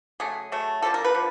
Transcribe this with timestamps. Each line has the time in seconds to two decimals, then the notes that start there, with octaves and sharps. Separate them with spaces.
0.20 C#3 F#3 A3 G#4
0.52 C#3 F#3 A3
0.82 D3 F3 A#3 A4
0.94 A#4
1.04 B4
1.14 D3 F3 A#3